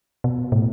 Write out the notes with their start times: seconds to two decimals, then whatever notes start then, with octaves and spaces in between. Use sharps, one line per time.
0.24 B2
0.52 A2